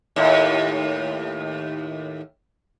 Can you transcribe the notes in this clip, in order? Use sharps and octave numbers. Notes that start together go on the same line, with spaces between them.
D#2 A2